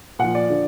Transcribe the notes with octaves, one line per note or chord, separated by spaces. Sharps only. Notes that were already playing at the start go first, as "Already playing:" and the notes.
A#2 F3 F#5
D5
D3 F3